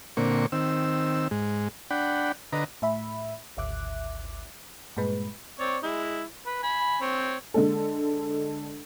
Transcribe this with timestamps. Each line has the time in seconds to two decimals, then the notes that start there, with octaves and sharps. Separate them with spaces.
0.17 A#2 D3 A#3 C4 C#6
0.52 D#3 C4 E6
1.31 G#2 G#3
1.91 D4 F#5 G5 B5
2.53 D3 B4 D#5 A#5
2.82 A2 E5 B5
3.57 G#1 D2 E5 D6 F#6
4.97 G2 A#2 G#3 B4
5.60 C4 C#5 D5
5.83 G#3 E4
6.46 B4
6.63 G#5 B5
7.01 C4 C#5
7.54 D3 G#3 A4